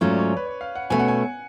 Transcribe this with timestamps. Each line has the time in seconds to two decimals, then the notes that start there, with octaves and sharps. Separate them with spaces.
0.01 G#2 F#3 A3 C#4 F4 C#5
0.10 D5
0.19 C#5
0.37 B4
0.47 C#5
0.61 F5
0.75 F#5
0.90 B2 A3 C#4 G#5
0.99 F#5
1.08 G#5